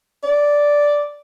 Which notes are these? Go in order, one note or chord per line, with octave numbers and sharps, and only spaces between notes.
D5